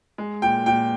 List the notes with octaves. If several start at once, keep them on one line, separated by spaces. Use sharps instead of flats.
G#3
A#2 G5
A#2 G5